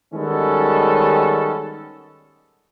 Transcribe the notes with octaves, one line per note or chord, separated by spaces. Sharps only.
D#3 G3 G#3 B3 C#4 A4